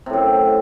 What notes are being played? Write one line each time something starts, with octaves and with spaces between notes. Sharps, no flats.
F#2 A2 C3